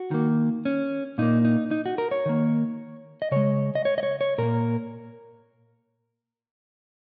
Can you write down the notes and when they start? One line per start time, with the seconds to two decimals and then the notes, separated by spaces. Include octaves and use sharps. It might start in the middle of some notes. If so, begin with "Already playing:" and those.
Already playing: F#4
0.11 D#3 A#3
0.65 C#4
1.18 A#2 A#3 D#4
1.45 D#4
1.71 D#4
1.86 F#4
1.98 A#4
2.11 C#5
2.26 D#3 A#3
3.22 D#5
3.31 C#3 G#3 C#5
3.75 D#5
3.85 C#5
3.98 D#5
4.03 C#5
4.21 C#5
4.38 A#2 A#3 A#4